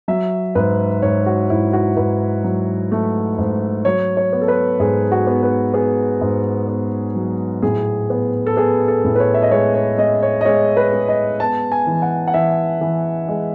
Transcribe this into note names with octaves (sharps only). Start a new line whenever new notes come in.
F#3 E5
G#2 B4
G#2 C#5
F#4
G#2 E4
F#4
G#2 B4
F#3
A3
G#2
F#3 C#5
C#5
B3
A4
B4
G#2 G#4
F#4
B3
B4
B3 G#4
G#2
B3
F#3
A2 G#4
B3
A4
B3 G#4
A4
A2
B4
C#5
E5
D#5
G#3 C#5
C#5
G#3 D#5
C#5
D#5
G#3 C#5
B4
G#3
D#5
B3 A5
G#5
E3
F#5
F#5
E3 E5
E3
G#3